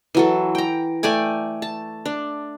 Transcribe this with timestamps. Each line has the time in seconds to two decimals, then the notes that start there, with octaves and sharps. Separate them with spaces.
0.15 E3 F#3 A4
0.55 G5 A#5
1.03 A3 D5 G5 G#5
1.62 A5
2.06 D4